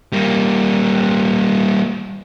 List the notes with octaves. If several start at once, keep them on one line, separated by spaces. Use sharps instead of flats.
G3 A#3